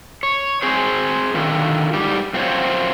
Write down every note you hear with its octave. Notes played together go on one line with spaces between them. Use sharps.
C#5
C4 G#4 C5
D3 D#3 F4
G#2 G3 G4
F#2 C4 F4 F#4 C5 C#5